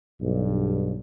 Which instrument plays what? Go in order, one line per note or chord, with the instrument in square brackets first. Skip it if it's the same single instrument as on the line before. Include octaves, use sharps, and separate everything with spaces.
[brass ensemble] B1 G2